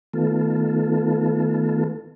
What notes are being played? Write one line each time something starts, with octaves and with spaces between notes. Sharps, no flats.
D#3 A3 B3 F4 A4